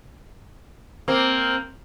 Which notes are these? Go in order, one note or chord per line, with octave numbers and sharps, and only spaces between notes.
A#3 C4